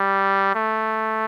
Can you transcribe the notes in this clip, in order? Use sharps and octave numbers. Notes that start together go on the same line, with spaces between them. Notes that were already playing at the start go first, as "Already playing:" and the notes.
Already playing: G3
A3